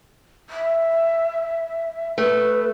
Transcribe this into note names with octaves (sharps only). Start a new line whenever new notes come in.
E5
A3 B4